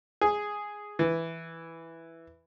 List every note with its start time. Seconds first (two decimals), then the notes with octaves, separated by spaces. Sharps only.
0.21 G#4
0.99 E3